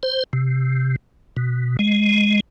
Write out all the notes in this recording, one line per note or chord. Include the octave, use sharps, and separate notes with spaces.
C5
C3
B2
G#3